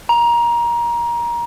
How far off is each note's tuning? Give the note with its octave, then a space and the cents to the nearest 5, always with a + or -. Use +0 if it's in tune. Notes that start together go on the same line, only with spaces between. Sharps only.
A#5 +20